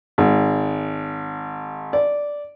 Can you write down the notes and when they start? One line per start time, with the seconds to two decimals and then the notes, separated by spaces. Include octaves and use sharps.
0.18 G#1
1.93 D5